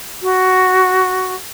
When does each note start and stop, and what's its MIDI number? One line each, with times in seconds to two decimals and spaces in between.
0.22 1.34 66